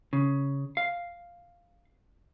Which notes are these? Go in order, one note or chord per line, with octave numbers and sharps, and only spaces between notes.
C#3
F5